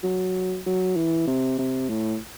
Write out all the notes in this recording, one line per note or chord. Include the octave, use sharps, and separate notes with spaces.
F#3
F#3
E3
C3
C3
A2